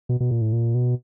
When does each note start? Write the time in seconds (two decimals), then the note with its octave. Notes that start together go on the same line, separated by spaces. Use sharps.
0.09 B2
0.20 B2
0.31 A#2
0.41 A2
0.53 A#2
0.75 B2